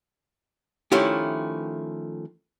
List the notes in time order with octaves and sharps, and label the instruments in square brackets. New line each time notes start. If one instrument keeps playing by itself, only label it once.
[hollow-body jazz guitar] D#3 F3 A3 C#4 E4 G4